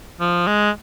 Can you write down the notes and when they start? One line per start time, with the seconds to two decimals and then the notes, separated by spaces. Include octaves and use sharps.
0.20 F3
0.47 G#3